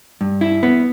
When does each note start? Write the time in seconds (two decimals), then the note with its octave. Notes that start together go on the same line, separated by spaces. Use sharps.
0.21 G2
0.41 E4
0.63 B3